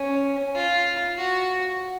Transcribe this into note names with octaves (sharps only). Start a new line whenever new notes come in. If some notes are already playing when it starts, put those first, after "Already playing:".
Already playing: C#4
F4
F#4